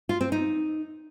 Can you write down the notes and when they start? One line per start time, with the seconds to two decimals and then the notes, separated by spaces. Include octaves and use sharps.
0.09 F4
0.21 C4
0.32 D#4